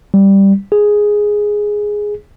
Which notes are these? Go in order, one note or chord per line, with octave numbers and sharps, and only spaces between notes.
G3
G#4